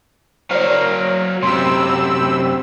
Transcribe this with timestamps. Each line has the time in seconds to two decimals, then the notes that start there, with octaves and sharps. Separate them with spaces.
0.51 F#3 A#4 C5 D5 F5
1.43 F#2 C3 G5 B5 C6 E6